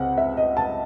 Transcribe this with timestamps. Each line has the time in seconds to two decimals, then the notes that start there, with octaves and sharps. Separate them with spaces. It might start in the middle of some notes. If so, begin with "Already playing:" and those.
Already playing: C#2 C3 C4 F#5
0.18 E5
0.37 D#5
0.57 A5